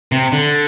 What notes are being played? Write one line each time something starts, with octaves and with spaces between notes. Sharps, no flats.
C3
D3